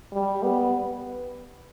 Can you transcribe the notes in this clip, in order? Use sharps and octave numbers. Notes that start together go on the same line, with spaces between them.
G3
B3